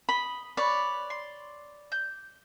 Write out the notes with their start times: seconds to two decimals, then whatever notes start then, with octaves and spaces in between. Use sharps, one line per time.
0.09 D#5 B5
0.57 B4 C#5 D5
1.10 C6
1.92 G6